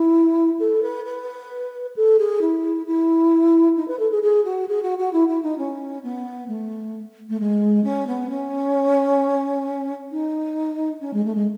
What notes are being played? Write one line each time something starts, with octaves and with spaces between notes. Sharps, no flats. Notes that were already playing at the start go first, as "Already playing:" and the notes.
Already playing: E4
A4
B4
B4
A4
G#4
E4
E4
D#4
B4
A4
G#4
G#4
F#4
G#4
F#4
F#4
E4
E4
D#4
C#4
B3
A3
A3
G#3
C#4
B3
C#4
D#4
C#4
G#3
A3
G#3